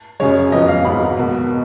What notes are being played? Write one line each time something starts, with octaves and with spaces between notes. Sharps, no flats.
F#2 C#3 G#3 C#5
F2 C#3 F3 B3 D#5
F5
G#1 G#2 F#3 B5
B1 B2 A#3